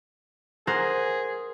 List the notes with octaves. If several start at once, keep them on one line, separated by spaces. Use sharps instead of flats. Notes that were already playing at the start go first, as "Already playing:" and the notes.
G#4 A#4 C5 F#5